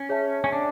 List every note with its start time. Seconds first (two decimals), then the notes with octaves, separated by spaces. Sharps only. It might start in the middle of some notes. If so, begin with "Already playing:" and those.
Already playing: C#4
0.09 G#4 C#5 E5 A5
0.44 C#4
0.52 D4